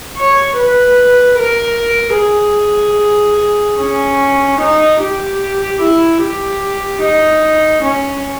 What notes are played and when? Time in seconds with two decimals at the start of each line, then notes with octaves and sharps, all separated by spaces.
0.18 C#5
0.58 B4
1.39 A#4
2.19 G#4
3.80 C#4
4.61 D#4
5.02 G4
5.82 E4
6.22 G4
7.03 D#4
7.83 C#4